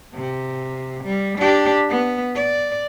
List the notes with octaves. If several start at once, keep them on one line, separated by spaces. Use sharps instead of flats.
C3
G3
D4 G4
B3
D5